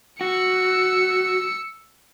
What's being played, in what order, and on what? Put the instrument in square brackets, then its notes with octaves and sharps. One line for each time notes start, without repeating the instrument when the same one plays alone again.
[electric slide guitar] F#4 [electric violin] E6 C#7